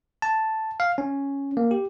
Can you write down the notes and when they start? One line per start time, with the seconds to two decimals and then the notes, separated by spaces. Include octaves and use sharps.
0.22 A5
0.80 F5
0.98 C#4
1.57 A#3
1.71 G4